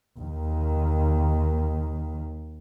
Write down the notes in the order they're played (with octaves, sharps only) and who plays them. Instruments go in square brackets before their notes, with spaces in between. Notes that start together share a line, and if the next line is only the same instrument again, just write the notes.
[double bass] D#2 D#3